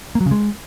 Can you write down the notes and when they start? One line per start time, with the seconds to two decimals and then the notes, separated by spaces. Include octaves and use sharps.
0.15 A#3
0.21 F#3
0.26 C#3
0.31 G#3